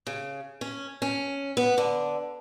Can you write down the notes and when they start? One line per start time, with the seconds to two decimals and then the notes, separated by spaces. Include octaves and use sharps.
0.07 C#3
0.61 C#4
1.02 C#4
1.57 B3
1.78 D3